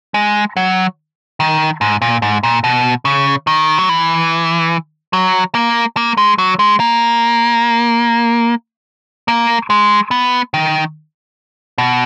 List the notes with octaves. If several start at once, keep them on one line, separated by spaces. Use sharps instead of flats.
G#3
F#3
D#3
G#2
A#2
G#2
A#2
B2
C#3
D#3
F#3
E3
F#3
A#3
A#3
G#3
F#3
G#3
A#3
A#3
G#3
B3
D#3
B2